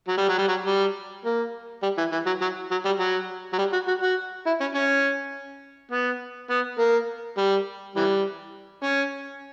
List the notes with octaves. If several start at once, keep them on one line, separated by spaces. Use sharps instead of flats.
F#3
G3
F#3
G3
F#3
G3
A#3
G3
E3
E3
F#3
F#3
F#3
G3
F#3
F#3
G3
F#4
F#4
F#4
E4
C#4
C#4
B3
B3
A#3
G3
E3 G3
C#4